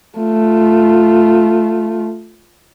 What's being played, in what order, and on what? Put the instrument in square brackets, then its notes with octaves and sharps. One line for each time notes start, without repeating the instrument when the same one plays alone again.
[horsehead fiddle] A3 F4